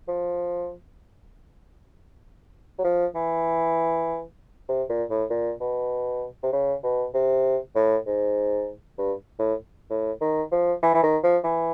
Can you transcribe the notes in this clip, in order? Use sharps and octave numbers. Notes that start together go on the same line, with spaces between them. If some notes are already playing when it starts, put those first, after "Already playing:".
F3
F#3
F3
E3
C3
A#2
A2
A#2
B2
C3
C#3
B2
C3
A2
G#2
G2
A2
A2
D#3
F3
E3
E3
D#3
F3
E3